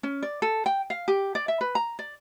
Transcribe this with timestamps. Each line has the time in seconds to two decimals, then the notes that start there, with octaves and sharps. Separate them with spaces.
0.03 C#4
0.23 D5
0.42 A4
0.66 G5
0.90 F5
1.08 G4
1.35 D5
1.48 E5
1.61 B4
1.75 A#5
1.99 D5